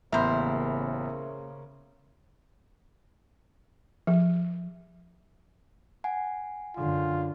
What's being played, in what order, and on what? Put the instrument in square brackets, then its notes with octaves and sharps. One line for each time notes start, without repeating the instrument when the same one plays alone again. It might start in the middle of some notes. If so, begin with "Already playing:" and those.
[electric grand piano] A1 B3 B5 [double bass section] C#3 A#3 [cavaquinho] A#4 C5 [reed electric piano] E5
[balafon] F3
[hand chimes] F#5 G#5
[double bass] F#2 D3 [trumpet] F4